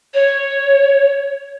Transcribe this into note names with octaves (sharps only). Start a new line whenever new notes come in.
C#5